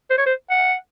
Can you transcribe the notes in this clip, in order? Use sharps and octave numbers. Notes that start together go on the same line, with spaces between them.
C5
C#5
C5
F#5